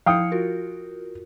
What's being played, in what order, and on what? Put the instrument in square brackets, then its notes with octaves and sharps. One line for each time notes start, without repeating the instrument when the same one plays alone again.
[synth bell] F3 E4 C#7 [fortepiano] F5 G5 D#6
[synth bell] F4 F#4 A#4